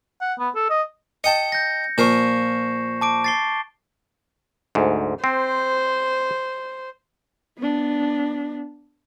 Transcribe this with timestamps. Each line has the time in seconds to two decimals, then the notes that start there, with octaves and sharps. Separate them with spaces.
0.21 F#5
0.39 B3
0.56 A4
0.70 D#5
1.24 D#5 G5 A5 C#7
1.52 G6 A#6
1.98 A#2 F3 A#4 C#6 C7 E7
3.01 A5 D6 D7
3.24 A6 C7 G7
4.75 D2 G#2
5.24 C4 C5
7.59 B3 D4